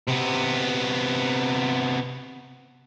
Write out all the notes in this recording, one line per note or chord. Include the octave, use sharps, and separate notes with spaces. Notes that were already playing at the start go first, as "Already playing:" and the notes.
C3 B3